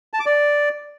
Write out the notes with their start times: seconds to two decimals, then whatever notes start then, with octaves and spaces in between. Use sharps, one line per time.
0.13 A5
0.20 D6
0.26 D5